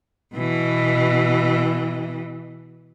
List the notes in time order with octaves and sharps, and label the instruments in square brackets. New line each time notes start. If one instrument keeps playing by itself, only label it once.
[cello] B2 E3